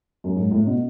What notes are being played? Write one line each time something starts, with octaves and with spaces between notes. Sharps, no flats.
F#2
G#2
A2
B2